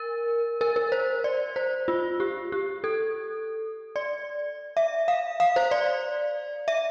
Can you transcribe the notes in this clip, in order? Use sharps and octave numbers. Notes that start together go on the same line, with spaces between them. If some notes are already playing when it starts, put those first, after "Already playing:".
Already playing: A#4
A#4
A#4
C5
D5
C5
F4
G4
G4
A4
D5
E5
F5
F5
C5
D5
E5